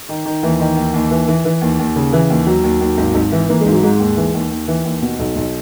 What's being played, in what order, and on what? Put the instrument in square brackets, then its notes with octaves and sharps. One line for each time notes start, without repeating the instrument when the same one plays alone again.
[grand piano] D#3
D#3
D#2 E3
D#3
D#2
D#2
E3
E3
E3
D#2
D#2
C#3
E3
D#2
D#2 F#3
D#2
D#2
G#1
G#1
E3
E3 A#3
G#3
G#1
F#3
G#2 G#3
D#2
E3
D#2
D#2
E3
D#2
B2
B1
B1